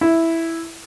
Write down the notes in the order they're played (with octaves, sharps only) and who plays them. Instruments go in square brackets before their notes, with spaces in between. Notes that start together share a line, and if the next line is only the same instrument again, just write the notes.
[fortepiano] E4